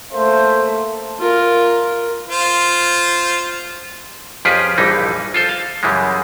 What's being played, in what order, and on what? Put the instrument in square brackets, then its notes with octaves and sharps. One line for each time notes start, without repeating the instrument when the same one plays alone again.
[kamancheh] A3 A#3 [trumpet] C5
[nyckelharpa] F4 A#4
[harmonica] F4 C5
[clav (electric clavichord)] F2 F3 C#4 G4 G#4 B4
A#1 G2 E3 G3 D#4
F4 A4 C5
F5
F#2 C#3 E3 G3 G#3